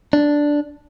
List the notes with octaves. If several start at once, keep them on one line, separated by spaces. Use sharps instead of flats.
D4